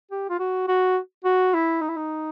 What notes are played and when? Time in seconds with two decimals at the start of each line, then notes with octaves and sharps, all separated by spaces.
0.11 G4
0.29 F4
0.39 F#4
0.68 F#4
1.24 F#4
1.54 E4
1.81 D#4
1.89 E4
1.97 D#4